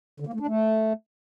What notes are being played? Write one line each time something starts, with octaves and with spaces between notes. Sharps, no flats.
D3
A#3
A3
D4
A3